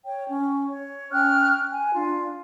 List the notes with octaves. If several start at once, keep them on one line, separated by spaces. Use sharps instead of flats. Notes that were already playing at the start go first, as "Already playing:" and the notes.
C#5 G5
C#4
C#5
C#4 G5 F6 F#6
G#5
D4 F4